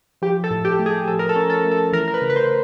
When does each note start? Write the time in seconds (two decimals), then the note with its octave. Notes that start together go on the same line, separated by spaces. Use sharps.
0.22 F3 G4
0.44 A4
0.50 A2
0.65 G4
0.79 A3
0.86 G#4
1.08 F3 A4
1.19 A#4
1.29 A4
1.36 C#4
1.50 A4
1.65 A3
1.72 A4
1.93 E3 A#4
2.08 A#4
2.14 B4
2.22 C#3
2.30 B4
2.36 C5